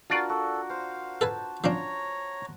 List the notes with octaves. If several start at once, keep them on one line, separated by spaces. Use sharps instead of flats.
D4 F4 F#4 A#4 D5
F#4 A4
C5 F5
A4 B4 G#5 A5
F3 C#4 D4 C#5 A#5